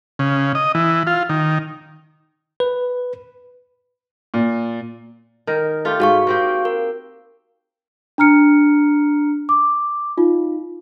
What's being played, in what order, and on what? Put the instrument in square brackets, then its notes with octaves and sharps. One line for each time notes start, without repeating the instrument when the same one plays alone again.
[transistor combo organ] C#3
D#5
E3
F4
D#3
[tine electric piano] B4
[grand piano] A#2
[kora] D#3 A#4
A3 F4 G4
[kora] G#2 [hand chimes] F#4 F5 C#6
[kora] A#3 C4 G4
[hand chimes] A#4
[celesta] D4 A#5 F6 C#7
D6
D#4 F4